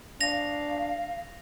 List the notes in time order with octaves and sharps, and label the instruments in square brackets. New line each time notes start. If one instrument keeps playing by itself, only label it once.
[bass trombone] D4 [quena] F5 [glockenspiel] A#6 F7